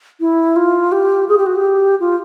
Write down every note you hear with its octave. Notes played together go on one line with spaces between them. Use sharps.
E4
F4
G4
G#4
G4
F#4
G4
F4